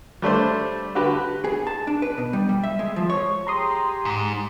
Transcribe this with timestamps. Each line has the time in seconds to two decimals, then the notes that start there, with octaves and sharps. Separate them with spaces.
0.22 G3 A3 D4 C5
0.95 D3 F#4 G4 B4
1.44 G#4
1.67 A5
1.87 D4
2.02 B4
2.18 B2
2.33 G3
2.49 G3
2.63 E5
2.79 G#3
2.96 F3
3.10 C#5
3.47 G4 G#4 A#5 C6 D#6
4.05 G#2